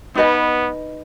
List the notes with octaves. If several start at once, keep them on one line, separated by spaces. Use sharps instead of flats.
B3 D#4 B4 D#5 G#5